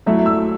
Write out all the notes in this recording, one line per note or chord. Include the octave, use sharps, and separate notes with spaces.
F#3 A3 E4 E5
E6